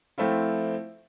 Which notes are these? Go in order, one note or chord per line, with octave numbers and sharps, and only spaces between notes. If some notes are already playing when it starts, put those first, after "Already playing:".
F3 A3 C4 E4 F4